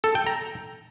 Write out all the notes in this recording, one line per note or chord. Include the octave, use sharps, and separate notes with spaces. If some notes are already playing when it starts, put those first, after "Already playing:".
A4
G5
A#5